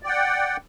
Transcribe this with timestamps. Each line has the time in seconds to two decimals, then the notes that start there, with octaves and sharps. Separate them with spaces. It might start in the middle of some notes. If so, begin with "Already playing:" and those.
0.03 D5
0.06 G5
0.09 F#5